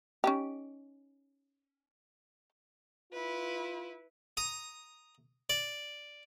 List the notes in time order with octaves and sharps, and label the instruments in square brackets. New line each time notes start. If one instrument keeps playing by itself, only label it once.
[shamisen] C#4 D#4 G4
[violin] E4 B4 [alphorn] F4
[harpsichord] A#5 D#6
D5